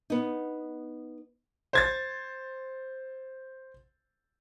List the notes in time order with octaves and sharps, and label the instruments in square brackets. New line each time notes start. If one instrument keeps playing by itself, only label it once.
[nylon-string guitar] B3 D#4
[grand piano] C5 G#6 A6